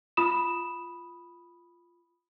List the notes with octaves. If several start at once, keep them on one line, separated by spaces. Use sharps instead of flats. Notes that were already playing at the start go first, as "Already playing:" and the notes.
F4 B5 D#6 E7